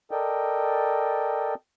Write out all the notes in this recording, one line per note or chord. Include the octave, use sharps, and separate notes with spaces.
A4 A#4 D5 D#5 G5